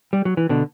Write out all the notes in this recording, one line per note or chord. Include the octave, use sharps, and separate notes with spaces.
G3
F#3
E3
B2 D3